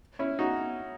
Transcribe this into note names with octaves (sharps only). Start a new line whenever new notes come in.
C#4 E4
D#4 F#4